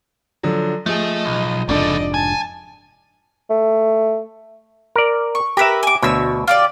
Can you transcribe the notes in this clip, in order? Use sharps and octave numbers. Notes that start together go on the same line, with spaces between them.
D3 F3 F#3
F3 A3 G#4 D#5
B1
F1 G#2 C#3 D4 A4 D5 D#5
G#5 A5
A3
A#4 D5
C#6
G4 A#4 B4 E5
G#5 D6
D2 B2 C#5 E6
F4 G4 D5